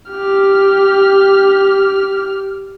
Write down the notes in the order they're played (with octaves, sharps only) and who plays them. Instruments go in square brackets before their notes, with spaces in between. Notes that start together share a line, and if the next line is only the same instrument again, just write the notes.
[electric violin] G4 F6